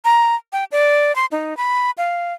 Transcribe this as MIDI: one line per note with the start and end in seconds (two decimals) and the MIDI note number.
0.05 0.35 82
0.53 0.64 79
0.72 1.15 74
1.16 1.26 84
1.32 1.56 63
1.57 1.91 83
1.98 2.34 77